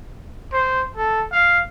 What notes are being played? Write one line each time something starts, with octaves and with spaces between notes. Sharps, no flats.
C5
A4
F5